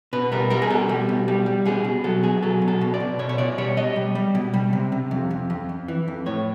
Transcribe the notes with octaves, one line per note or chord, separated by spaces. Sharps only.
B2 B4
G3 A#4
G3 A#4
G#4
B2 A4
G3
B2
G3
G3
B2 G#4
B2
F#3 A4
B2 G#4
F#3 A4
B2
A4
B2
D5
B2
B2 C#5
C#5
B2 D5
G3 C#5
B2 D#5
G3
G3
B2
G3
C3
C3
F2
F2
F2
F2
E3
F2
A2 C#5